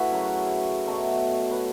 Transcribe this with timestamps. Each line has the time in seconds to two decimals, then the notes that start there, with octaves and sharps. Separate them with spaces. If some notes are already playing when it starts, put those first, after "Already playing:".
Already playing: A3 E4 F#4 B4
0.11 F#2 C#3 F#3
0.87 B2 F#3 A3
1.51 B4